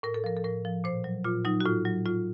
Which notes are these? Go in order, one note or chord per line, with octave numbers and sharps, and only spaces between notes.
A2 A#4
A4
F3 A#4
A4
A2 A#4
F3
A#2 C5
F#3
A#2 F4
F#3 D#4
F#4
A2 F4
F#3
A2 F4